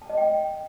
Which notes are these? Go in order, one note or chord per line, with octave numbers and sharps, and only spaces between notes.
A5
D#5
G5